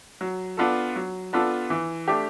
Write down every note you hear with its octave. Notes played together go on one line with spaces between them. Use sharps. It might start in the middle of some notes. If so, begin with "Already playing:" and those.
F#3
B3 D4 F4 A4
F#3
B3 D4 F4 A4
E3
A3 D4 G4